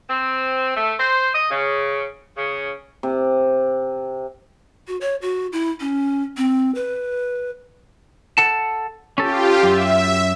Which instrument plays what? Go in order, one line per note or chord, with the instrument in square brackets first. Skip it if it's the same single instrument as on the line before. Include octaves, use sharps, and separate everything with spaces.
[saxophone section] C4
A3
C5
D#5
C#3
C#3
[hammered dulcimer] C3
[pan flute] F#4
C#5
F#4
E4
C#4
C4
B4
[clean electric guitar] A4 F#5 A5
[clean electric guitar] C#4 A4 [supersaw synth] F4 G4
[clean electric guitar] F#2 [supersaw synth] E5